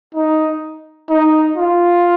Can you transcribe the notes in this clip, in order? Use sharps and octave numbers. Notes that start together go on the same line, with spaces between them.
D#4
D#4
F4